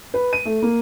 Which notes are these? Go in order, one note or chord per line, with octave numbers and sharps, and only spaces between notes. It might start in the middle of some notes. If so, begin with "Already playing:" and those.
B4
D#7
A3
A#3